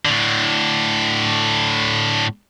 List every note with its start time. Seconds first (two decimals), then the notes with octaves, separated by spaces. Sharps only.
0.05 A2 D3